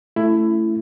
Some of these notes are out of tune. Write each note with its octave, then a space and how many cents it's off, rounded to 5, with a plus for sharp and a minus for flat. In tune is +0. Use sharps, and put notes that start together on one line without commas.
A3 +0 C#4 +0 E4 +15